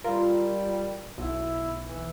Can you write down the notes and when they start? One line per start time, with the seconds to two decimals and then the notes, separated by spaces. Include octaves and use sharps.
0.04 G3 F4 A#4
1.18 B1 E4
1.85 E3